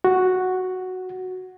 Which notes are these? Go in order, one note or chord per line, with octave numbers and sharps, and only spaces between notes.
F#4